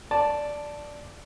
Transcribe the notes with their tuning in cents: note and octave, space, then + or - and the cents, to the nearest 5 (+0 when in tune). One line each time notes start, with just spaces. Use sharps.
D5 +0 A5 +0